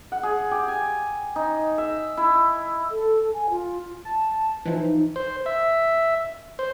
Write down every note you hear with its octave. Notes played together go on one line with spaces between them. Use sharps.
F#5
G#4
G4
G#5
D#4
E5
E4
A4
G#5
F4
A5
E3 F3 D#4
C5
E5
C5